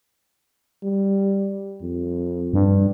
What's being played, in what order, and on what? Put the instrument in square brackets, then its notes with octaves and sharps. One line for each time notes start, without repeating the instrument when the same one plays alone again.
[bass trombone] G3
F2
[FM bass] G2